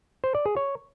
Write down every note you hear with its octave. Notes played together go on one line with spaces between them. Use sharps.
C5
D5
G#4
C#5